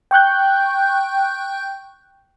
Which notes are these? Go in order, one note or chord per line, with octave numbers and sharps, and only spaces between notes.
G5 C#6 F#6 G6